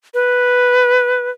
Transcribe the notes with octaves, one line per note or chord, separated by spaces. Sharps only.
B4